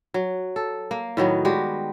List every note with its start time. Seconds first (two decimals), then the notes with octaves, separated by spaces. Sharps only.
0.14 F#3
0.56 A4
0.91 A#3
1.17 A2 D#3 F#3 B3
1.45 G3 G#3 F#4 G4